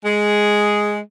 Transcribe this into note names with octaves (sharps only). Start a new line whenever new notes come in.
G#3 G#4